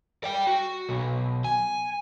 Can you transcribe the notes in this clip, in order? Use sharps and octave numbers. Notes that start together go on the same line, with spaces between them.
D5 G5
F#4
B1
G#5